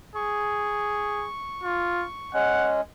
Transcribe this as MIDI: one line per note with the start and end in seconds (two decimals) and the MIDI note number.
0.15 1.27 68
0.15 2.33 85
1.63 2.06 65
2.34 2.81 56
2.34 2.81 61
2.34 2.72 78